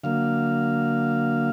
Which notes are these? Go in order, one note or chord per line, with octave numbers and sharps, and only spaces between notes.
D3 F#3 A#3 F5